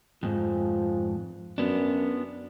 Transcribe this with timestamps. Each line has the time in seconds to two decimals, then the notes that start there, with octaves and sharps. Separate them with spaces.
0.23 F2 G#2 F3
1.58 F#2 B3 D4